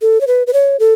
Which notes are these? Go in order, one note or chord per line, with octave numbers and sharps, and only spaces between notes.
A4
C#5
B4
B4
C#5
A4